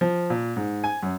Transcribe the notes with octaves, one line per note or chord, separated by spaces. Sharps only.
F3
A#2
G#2
G#5
F#2